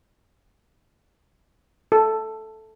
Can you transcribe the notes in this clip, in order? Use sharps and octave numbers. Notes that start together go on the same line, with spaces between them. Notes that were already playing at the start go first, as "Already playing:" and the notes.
A4